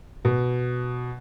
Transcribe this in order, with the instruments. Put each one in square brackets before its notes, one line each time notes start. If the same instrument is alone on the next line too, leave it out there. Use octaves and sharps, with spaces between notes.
[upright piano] B2